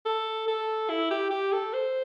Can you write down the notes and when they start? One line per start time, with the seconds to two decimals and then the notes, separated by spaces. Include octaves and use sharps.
0.05 A4
0.47 A4
0.90 E4
1.10 G4
1.30 G4
1.52 A4
1.73 C5